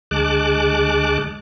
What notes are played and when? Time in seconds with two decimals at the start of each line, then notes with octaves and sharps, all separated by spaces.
0.11 D2 G#3 A5 D6 F#6